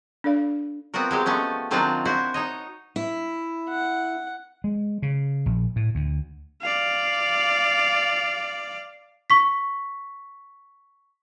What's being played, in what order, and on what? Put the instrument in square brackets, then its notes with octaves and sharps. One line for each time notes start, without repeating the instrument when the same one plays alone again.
[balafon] D4 A4 D5 F5
[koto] B3 C4 F4 F#4 A#4
F#3 G#3 G4
F3 A3 B3 C#4
D#3 F#3 C4 D4 D#4 F4
E4 F#4 C5
D#4 C#5 D#5
[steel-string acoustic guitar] E4
[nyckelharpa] F#5
[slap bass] G#3
C#3
A#1
A2
D2
[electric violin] D5 F5
[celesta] C#6 B6